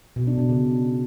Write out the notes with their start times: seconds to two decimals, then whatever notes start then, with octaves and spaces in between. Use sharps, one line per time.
0.16 B2
0.27 D4
0.38 B2
0.49 C#3